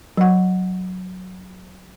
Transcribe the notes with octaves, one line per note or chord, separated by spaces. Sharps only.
F#3 F#5